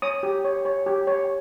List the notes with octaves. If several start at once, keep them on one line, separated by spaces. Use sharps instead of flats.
C#5 D#6
G4
C#5
C#5
G4
C#5